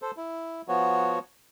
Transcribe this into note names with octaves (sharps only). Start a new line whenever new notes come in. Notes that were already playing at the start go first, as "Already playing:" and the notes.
A4 C5
E4
F3 B3 F#4 C#5